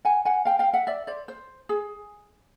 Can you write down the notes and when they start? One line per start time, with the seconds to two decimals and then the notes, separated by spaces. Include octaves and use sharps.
0.05 F#5 G#5
0.25 F#5 G#5
0.45 F5 G5
0.59 F5 G5
0.73 E5 F#5
0.87 D5 E5
1.07 C5 D5
1.28 C5
1.69 G#4